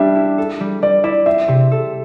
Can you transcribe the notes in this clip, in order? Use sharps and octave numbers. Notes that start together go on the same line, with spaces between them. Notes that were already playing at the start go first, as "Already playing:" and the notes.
Already playing: G3 D4 G4 E5
E4
A4
G3
G3 D5
E4 D5
C4 E5
C3
A4